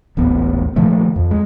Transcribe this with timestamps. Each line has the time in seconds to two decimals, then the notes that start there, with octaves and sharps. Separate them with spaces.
0.17 D#1 A1 B3
0.76 A#2 D#3 F3 A3
1.16 F2
1.31 G#3